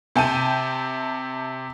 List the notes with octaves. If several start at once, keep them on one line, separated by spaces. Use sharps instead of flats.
C3 G5 A5 D#7